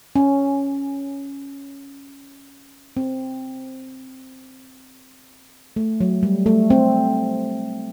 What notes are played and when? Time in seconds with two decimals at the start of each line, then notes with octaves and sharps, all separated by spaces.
0.16 C#4
2.97 C4
5.76 A3
6.01 F#3
6.23 G3
6.46 A3
6.70 C4